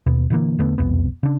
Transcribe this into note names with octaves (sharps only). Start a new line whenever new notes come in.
D#2 B2 B3
A#2 D3 E3 A#3
E2 D3 A3 B3
E1 C2 F2 B3
C#3 D4